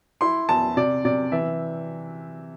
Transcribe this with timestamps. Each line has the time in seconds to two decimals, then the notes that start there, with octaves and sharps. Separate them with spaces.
0.21 E4 C6
0.49 E2 A5
0.77 C3 D5
1.05 C3 D5
1.32 E3 E5